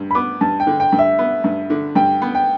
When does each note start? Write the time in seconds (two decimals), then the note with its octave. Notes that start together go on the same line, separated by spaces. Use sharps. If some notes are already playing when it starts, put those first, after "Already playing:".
Already playing: G2
0.11 B5
0.15 B3 D6
0.41 G2 A5
0.60 G5
0.67 D3
0.80 G5
0.92 G2
0.99 E5
1.19 B3
1.44 G2
1.70 D3
1.95 G2 G5
2.22 B3
2.35 G5